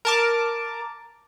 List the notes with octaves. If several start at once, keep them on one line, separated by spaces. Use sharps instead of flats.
A#4 A5 D6